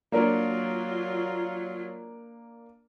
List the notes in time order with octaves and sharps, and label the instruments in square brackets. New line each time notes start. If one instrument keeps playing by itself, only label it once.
[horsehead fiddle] F#3 F4 [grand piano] A#3 D4 A#4